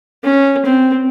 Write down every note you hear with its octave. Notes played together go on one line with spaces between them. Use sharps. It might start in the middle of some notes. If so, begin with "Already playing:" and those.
C#4
C4